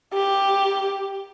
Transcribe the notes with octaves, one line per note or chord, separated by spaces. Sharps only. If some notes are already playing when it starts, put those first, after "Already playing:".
G4